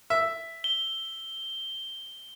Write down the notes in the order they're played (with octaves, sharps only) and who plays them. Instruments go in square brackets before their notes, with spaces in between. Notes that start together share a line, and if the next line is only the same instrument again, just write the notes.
[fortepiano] E5
[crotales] G7